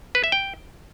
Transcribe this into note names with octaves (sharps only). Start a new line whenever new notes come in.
B4
E5
G5